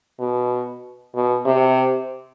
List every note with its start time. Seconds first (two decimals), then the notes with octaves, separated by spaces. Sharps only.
0.19 B2
1.15 B2
1.45 C3